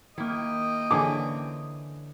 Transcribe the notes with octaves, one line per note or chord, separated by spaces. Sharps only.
D#3 A#3 E4 D#5 G5
D3 E3 C#4 G#5 D6